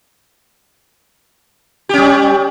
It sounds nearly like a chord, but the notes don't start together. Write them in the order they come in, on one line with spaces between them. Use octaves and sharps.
G4 C#4 G3